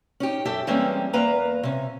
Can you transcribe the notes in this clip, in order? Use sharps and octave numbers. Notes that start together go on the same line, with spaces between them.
C#4 D#4 G4
F#2 G4 A4 E5
E3 G3 G#3 A#3 C4 C#4
E2 A#3 B4 A#5
C3 C#4